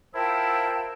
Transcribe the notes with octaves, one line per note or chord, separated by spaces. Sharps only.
E4 F4 A#4 C5 E5 G5 A5